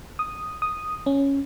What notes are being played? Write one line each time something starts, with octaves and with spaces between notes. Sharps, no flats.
D#6
D#6
C#4